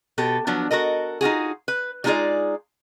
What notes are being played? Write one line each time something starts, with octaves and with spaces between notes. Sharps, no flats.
B2 G4 A4
F3 F#3 B3 D4
F#4 A4 A#4 D#5
D#4 F4 F#4 G#4
B4
G3 G#3 D#4 F4 G#4 D5